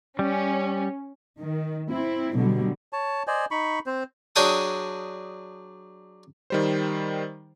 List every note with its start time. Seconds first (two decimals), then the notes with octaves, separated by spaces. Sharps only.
0.19 G3 C#4
1.39 D#3
1.91 C4 E4
2.34 B2 D3 F#3 G3
2.93 C#5 A5
3.27 C5 D5 D#5 G#5
3.51 D#4 B5 C#6
3.86 C4 C5
4.36 F#3 D4 G#4 G5 D#6
6.50 D#3 G3 C5